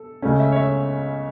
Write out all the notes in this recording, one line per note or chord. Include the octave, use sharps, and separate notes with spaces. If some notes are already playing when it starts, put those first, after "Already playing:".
Already playing: A4
C#2 C#3 A3 C#4
E5
C#5
E5